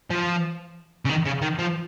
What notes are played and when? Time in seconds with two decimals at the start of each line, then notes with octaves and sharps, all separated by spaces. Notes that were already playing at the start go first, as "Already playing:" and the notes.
0.11 F3
1.05 C#3
1.09 D#3
1.26 C#3
1.42 D#3
1.59 F3